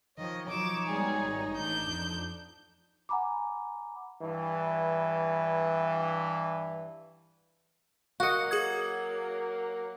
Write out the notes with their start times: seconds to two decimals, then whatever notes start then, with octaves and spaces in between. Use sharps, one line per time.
0.18 D#3 F3 C#5 D#5
0.48 F3 F#3 D#4 C#5 D6 E7
0.88 B2 G3 G#3 G#4
1.23 G#1
1.54 A1 D4 G6
1.86 F2
3.09 F#5 G#5 A#5 B5 D6
4.21 G2 E3
8.20 F#3 A#3 F#4 D#5 F5 C#7
8.51 G#4 D#6 G#6